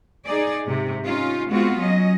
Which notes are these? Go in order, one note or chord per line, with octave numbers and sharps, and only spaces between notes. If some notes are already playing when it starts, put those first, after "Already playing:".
D#4 G#4 D5
G#2 C3
C#4 D#4 F4
G#3 B3 C4 F4 F#4
F#3 C#4 D#5